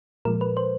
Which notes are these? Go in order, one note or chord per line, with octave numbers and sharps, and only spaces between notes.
A#2 F3 G#3 A#4
B4
C5